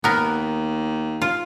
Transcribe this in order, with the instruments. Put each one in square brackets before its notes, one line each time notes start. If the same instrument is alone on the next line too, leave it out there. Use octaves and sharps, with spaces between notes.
[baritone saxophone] D#2 [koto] B3 A#4
[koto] F4